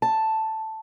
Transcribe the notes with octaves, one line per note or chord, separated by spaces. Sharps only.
A5